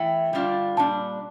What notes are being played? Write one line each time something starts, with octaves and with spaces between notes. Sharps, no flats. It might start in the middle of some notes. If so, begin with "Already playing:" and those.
Already playing: E3 A3 E4 G5
D3 G3 D4 F4
A#2 G3 D4 A5